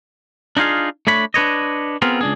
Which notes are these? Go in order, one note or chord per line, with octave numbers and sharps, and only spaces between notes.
D4 D#4 F4 G#4 F5
A3 D4 C#5 B5
D4 B4 C#5 D#5
B3 C4 F4 G#4 A#4
C#2 D4 G#4